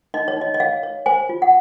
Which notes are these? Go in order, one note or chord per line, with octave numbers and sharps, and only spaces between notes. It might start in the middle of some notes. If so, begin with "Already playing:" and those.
D#4 D#5
C#5
D#4 D#5
D#5
C#5 F5
C#5
C5 G#5
F4
F#5